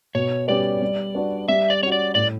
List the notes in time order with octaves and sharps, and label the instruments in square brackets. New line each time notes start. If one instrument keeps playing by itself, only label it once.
[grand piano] B2 [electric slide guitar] C#5
[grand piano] G3 C#4 G4 B4 [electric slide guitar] D5
[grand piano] G3
D4 F#4 B4
[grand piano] G3 [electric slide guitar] E5
[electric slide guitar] D5
[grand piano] C#4 F#4 [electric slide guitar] C#5
[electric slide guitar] D5
[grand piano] A2 [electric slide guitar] D5